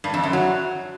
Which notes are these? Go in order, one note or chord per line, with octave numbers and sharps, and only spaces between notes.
G2
F2
F#2
F#3